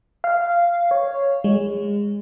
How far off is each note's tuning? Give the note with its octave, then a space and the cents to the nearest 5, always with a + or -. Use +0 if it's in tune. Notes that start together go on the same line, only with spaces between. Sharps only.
F5 -10
C#5 +0
G#3 -25